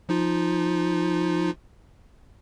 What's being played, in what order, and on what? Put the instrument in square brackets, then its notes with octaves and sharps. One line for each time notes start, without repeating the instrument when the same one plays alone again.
[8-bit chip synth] F3 D#4 F4